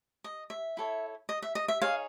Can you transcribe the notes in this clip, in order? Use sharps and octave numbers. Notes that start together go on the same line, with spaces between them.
D#5
E5
E4 A4 C#5
D#5
E5
D#5
E5
D#4 G#4 C#5 F5